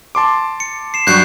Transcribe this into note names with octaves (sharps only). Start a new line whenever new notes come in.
A5 C6 D6
C#7
C7 E7
G2 F#3 C#6 F#6 G6 C7